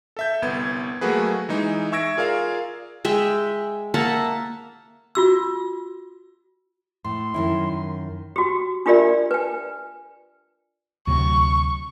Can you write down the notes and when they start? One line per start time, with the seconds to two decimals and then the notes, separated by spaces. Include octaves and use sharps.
0.17 A4 E5 G6
0.42 G1 C2 B3 G#6
1.01 F#3 A3 A#3 F#4 G#4 B4
1.49 E3 G#3 D#4
1.92 E5 C#6 E6 G#6 A#6 D7
2.17 F4 G#4 A#4 D5 F5
3.05 G#3 E5 G5
3.94 A#3 E5 F#5 A5
5.15 F4 F#4 E6
7.05 A2 C6
7.34 F#2 D#3 E4
8.36 F#4 G4
8.86 D4 F4 G4 A#4 D5 E5
9.31 B4 G#5
11.07 D2 C3 F#3 C#6